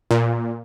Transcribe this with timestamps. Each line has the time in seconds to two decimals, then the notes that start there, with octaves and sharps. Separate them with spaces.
0.11 A#2